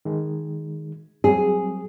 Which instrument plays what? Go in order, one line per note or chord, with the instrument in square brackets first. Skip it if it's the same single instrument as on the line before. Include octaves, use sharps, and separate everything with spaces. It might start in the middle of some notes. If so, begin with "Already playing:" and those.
[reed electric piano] D#3 G#3
[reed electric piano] F#3 G3 C4 [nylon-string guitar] G#4